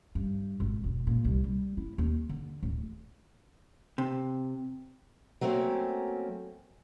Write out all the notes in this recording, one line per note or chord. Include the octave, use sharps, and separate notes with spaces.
G2
G#1
E1
A#2
C2
G3
E4
D#2
D3
D1
C3
F#3 A3 A#3 C4 C#4